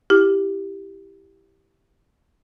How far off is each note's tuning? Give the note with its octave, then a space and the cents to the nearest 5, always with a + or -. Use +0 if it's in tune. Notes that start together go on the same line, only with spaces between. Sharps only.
E4 +0 G4 +0